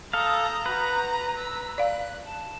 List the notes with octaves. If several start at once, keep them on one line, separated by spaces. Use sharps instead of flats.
A4 F5 A5 A#5 D#6 G6
F#4 B4 G6
E6
D5 F5 F#6
A5